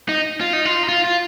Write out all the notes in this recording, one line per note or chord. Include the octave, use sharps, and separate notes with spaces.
D#4
F4
D#4
F4
D#4
F4
F4